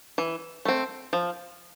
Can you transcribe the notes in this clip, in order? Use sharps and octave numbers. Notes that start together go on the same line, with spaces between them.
E3
A3 C4
F3